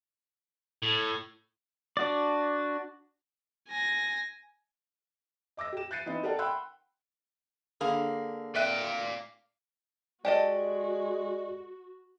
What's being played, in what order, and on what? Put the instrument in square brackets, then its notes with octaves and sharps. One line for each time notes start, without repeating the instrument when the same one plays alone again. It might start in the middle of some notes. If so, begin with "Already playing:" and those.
[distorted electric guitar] A2
[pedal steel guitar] D4 F#4 D5
[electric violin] G#5 A#6
[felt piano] D#5 D6 E6 A#6
G4 E7
F#6 G6 A6 C7 C#7 D#7
E3 B3 C4 D#4 D#5
G4 A4 A#4 D5 F#5 A5
F#5 G5 B5 C6 E6 F#6
[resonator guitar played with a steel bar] D3 A#3 [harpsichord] G#4
[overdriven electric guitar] D5 F5 [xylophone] E5 F#6 D#7 [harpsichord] G5
[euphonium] G#3 [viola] F#4 [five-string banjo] G4 A4 D#5 [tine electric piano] D5